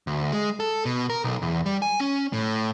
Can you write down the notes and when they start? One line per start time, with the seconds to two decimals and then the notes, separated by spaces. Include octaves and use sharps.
0.07 D2
0.32 G#3
0.60 A4
0.85 B2
1.10 A#4
1.24 B1
1.42 E2
1.66 G3
1.82 G#5
2.00 C#4
2.33 A2